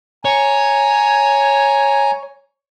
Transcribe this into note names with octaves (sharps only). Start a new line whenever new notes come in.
C#5 G#5 A#5